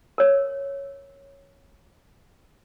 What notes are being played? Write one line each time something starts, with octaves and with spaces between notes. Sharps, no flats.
A#4 C#5